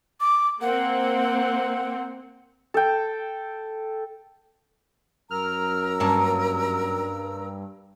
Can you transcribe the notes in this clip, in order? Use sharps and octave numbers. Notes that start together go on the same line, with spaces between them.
D6
A#3 C4 F#5
A4 G5
F#2 A#4 A#5 E6 F6
G2 A#3 C#4 A5